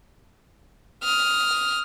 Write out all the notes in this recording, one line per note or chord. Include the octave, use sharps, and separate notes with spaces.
D#6 F6